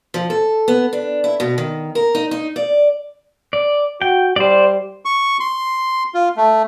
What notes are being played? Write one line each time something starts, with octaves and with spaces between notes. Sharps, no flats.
F3
A4
B3
D4
E4
B2
D#3
A#4
D#4
D#4
D5
D5
F#4 G5
G3 C5 D5
C#6
C6
F4
A3